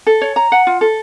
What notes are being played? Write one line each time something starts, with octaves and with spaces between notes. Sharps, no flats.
A4
C#5
A#5
F#5
F4
A4